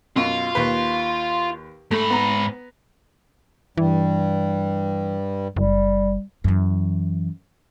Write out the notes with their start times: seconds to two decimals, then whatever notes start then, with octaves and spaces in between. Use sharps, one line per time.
0.16 F#2 B2 F4
0.55 D#2 B4
1.91 G#2 A3 B5
2.10 B3 A#5
3.77 G2 E3 G3
5.56 F#1 G3
6.44 F#2 E3